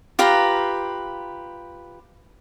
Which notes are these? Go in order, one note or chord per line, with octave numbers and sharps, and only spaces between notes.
F4 G4 B4 A#5